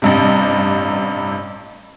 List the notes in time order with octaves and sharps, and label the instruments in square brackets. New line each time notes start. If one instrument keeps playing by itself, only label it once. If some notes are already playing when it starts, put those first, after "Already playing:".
[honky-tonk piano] A1 G2 C3